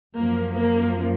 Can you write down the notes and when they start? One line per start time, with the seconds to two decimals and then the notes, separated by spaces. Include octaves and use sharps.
0.17 F#2 F3 A#3
0.58 A#3